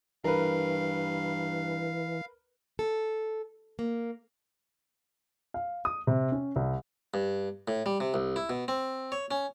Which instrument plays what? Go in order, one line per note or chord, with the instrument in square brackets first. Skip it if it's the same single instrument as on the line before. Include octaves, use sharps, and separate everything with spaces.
[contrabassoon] G2 [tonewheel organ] E3 [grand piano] A#4 B4 [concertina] F5
[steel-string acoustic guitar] A4
A#3
[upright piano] F5
D#6
C3
C#4
C2
[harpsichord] G2
A2
G3
C3
C2
E4
B2
C4
C#5
C#4